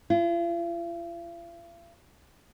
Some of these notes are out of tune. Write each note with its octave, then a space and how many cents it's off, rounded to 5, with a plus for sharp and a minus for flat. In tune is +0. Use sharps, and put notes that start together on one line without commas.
F4 -45